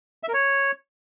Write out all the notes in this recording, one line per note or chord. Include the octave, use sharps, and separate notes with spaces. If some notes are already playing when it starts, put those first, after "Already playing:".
E5
A#4
C#5